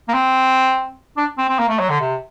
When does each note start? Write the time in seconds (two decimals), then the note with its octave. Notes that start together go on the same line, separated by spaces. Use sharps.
0.09 A#3
0.14 C4
1.17 D4
1.38 C4
1.48 C4
1.59 A#3
1.69 A3
1.79 F#3
1.90 D3
2.00 C3